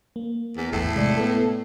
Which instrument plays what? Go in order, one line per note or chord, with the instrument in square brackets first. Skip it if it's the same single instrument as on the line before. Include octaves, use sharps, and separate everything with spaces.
[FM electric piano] A#3
[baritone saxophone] E2
[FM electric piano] G#1 E2 [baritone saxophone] A2
[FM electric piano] C3 G#3 D5
B3 A4